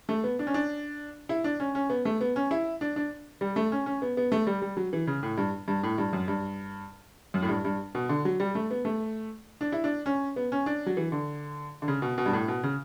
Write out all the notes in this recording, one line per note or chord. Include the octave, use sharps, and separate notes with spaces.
A3
B3
D4
C#4
D4
E4
D4
C#4
C#4
B3
A3
B3
C#4
E4
D4
D4
G3
A3
C#4
C#4
B3
B3
A3
G3
G3
F#3
E3
C#3
A2
G2
G2
A2
G2
F#2
G2
F#2
A2
G2
G2
B2
D3
F#3
G3
A3
B3
A3
D4
E4
D4
C#4
B3
C#4
D4
F#3
E3
D3
D3
C#3
B2
B2
G2
A2
B2
C#3